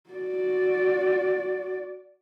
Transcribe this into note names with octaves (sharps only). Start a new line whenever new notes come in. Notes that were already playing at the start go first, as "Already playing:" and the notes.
F#4 D5